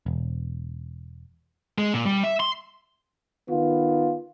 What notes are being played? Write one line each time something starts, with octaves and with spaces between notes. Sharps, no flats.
E1
G#3
A#2
G3
E5
C6
D#3 B3 F4